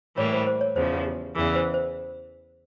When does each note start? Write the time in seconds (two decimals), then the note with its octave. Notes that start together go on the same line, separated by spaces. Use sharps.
0.17 A2 E3 G3 A#3 C#5
0.32 C5
0.47 C5
0.61 C#5
0.75 E2 C#3 F3 C5
1.06 G4
1.35 E2 C#3 E3 G#4
1.55 C5
1.74 C5